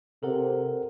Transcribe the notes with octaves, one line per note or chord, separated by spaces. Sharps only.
C3 A4 A#4 F#5